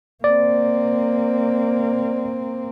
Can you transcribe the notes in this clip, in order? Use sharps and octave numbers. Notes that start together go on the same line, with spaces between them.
A#3 C4 D5